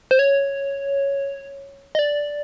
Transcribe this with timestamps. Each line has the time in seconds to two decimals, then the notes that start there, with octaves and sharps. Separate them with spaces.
0.11 C5
0.19 C#5
1.95 D#5
1.99 D5